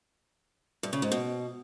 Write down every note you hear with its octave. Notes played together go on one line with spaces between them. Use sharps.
G2
C#3
G#2
B2